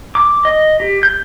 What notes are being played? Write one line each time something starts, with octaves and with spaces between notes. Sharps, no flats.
D6
D#5
G4
G6